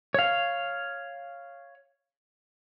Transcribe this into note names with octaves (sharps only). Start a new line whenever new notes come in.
C#5 F5